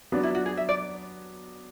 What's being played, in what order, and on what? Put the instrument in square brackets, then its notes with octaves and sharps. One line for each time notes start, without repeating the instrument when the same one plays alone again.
[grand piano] F#3 B3 D4
[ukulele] E4
F#4
G#4
E5
D5